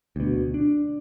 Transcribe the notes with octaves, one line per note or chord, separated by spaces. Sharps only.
D2 B2
D4